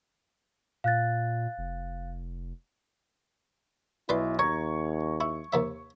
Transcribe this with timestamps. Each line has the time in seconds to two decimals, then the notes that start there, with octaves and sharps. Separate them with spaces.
0.84 A#2 F5 F#6 A6
1.58 F1
4.09 B1 E4 B4 D5 C6
4.39 D#2 C#5 A#5 C#6 G#6
5.20 E4 C#6
5.53 D#2 C3 E5